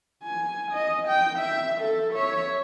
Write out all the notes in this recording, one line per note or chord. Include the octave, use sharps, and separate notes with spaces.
G#5
D#5
G5
E5
A4
C#5 E5